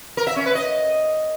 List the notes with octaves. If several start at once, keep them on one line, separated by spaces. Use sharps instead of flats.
A#4
E5
C#4
B4
D#5